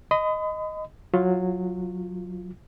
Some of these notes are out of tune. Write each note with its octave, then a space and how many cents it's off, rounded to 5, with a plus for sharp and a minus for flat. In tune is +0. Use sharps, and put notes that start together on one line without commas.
D#5 +0 B5 +40
F#3 -15 F4 +0